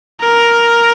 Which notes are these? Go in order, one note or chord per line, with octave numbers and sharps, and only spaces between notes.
A#4